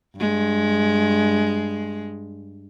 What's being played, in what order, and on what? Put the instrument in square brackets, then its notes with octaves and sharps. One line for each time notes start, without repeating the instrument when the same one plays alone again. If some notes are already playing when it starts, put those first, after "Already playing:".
[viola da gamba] G2 G#3